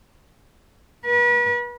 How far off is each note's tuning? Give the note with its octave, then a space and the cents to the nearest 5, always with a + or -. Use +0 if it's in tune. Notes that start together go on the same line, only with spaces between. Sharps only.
B4 -40